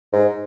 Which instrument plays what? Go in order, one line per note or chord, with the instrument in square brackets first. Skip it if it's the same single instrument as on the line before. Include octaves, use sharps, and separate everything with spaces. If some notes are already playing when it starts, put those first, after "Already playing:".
[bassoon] G#2